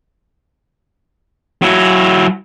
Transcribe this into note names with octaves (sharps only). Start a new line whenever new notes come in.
F#3 E4